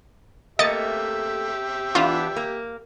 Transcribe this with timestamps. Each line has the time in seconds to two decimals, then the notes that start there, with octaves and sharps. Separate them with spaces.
0.59 A3 A#3 G4 D#5 E5 A6 C#7
1.95 E3 B3 D4 F4
2.36 A#3